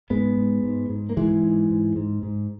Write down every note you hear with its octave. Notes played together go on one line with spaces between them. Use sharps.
G#2 G#3 B3
G#2
G#2
G#2
A#3
G#2 E3 G#3
G#2
G#2
G#2
G#2